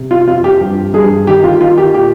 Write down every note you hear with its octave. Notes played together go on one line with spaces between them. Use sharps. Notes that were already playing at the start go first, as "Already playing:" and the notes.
Already playing: C3
F4
F2 F4
G4
G2
G2 G#4
D#3 G4
F4
D#3 F4
G4
A#2 G4